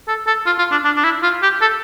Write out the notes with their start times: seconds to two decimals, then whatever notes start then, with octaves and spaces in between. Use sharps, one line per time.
0.08 A4
0.27 A4
0.46 F4
0.58 F4
0.71 D4
0.85 D4
0.96 D4
1.03 E4
1.23 F4
1.42 G4
1.61 A4